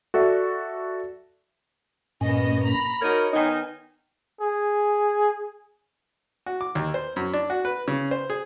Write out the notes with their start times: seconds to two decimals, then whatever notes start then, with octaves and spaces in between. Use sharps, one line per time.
0.14 F#4 A4 D5 E5
2.21 G2 A#2 A#3 B3 C#4 D#5
2.64 A#5 B5
3.02 D#4 F#4 A#4 C#5
3.33 D#3 B3 D#4 G#5
4.41 G#4
6.46 F#4
6.61 D6
6.75 D#2
6.94 C5
7.16 F#2
7.33 D4
7.50 F#4
7.65 B4
7.88 C#3
8.11 C5
8.30 G#4